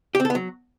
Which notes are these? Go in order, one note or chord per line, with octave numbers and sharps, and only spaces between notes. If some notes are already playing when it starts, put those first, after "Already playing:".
G4
C4
A4
B3
F#3